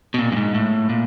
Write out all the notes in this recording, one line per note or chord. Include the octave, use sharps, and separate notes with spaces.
B2
A#2
G2
G#2
A2
A#2